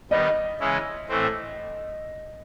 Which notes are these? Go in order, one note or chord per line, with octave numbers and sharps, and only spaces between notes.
D#3 G3 B3 D#4 D#5
C#3 E3 G#3 C#4 E4
A2 E3 A3 C4